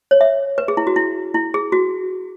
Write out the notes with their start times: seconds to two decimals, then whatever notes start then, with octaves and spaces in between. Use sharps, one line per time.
0.11 C#5
0.21 E5
0.58 B4
0.68 G#4
0.77 E4
0.87 F#4
0.96 E4
1.34 E4
1.54 G#4
1.72 F#4